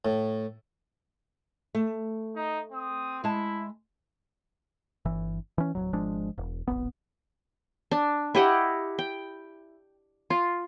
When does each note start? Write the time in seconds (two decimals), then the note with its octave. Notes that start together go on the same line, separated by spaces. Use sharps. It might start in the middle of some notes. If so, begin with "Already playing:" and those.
0.05 A2
1.75 A3
2.36 D#4 D#5
2.72 C4 D#6
3.24 G#3 E4 A5
5.05 G1 E3
5.58 E3 C#4
5.75 D1 F#2 F#3
5.93 G#1 F3 G#3 D4
6.38 E1
6.68 D1 G#1 B3
7.91 D4
8.35 E4 G4 D#5 F#5
8.99 G5
10.30 F4